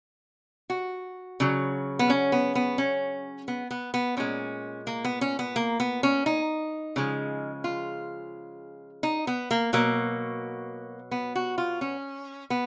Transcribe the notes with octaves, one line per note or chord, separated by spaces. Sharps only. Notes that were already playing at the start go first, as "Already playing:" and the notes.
F#4
C#3 F#3
B3
C#4
B3
B3
C#4
B3
B3
B3
A#2 G#3 C#4
A#3
B3
C#4
B3
A#3
B3
C#4
D#4
C#3 F3 G#3
F4
D#4
B3
A#3
B2 F#3 A#3
B3
F#4
F4
C#4
B3